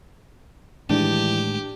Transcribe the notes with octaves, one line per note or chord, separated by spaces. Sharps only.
A2 D#3 E3 G#3 D4 G4